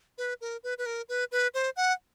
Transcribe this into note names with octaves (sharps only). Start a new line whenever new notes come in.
B4
A#4
B4
B4
A#4
B4
B4
C5
F#5